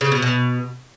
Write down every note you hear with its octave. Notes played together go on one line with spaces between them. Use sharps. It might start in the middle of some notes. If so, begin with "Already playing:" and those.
C#3
B2
B2